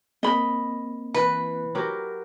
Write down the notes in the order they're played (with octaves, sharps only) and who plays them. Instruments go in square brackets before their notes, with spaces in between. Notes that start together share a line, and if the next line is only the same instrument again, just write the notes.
[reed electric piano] A#3 C4 [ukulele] D#5 B5
[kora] E3 [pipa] B4
[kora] F#3 G4 A#4